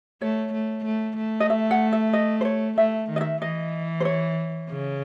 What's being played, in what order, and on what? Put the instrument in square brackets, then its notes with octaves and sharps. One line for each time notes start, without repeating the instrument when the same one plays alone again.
[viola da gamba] A3 [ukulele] C#5
[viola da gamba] A3
A3
A3
[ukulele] D#5
E5
F#5
E5
D#5
C5
C#5
[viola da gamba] A3 [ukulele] E5
[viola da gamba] D#3
[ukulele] D#5
E5
[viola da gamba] E3 [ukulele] D#5
[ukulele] C5
C#5
[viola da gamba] C#3